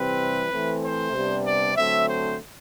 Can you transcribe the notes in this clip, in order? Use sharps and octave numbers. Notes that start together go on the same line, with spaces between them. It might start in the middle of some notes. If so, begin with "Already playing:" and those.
Already playing: C3 E3 G3 C4 B4
E3 A3 C4
C5
C3 G3 B3 D4
D5
D3 F#3 A3 C4 E5
C5